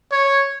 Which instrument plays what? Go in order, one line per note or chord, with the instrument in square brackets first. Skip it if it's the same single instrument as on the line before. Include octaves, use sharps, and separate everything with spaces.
[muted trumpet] C#5